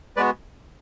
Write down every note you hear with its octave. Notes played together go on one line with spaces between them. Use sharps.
G#3 B3 F#4 B4 D5